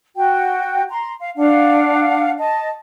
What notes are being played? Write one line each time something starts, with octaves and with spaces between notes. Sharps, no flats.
F#4 G5
A#5 C6
F5
D4 F5 F#5
D#5 A5